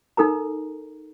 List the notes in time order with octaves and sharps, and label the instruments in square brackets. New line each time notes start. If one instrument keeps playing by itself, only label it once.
[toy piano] D#4 A4 A#4 A#5